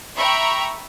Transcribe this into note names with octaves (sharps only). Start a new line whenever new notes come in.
E5 G5 A#5 B5 C#6